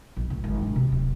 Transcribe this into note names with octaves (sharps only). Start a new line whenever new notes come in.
A#1
C#2 A2
G#1
A1 D4
C3
D1